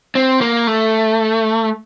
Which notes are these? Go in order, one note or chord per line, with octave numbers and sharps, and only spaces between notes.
C4
A#3
A3